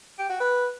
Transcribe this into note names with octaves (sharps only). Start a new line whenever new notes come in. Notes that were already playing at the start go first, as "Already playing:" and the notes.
G4
F#4
B4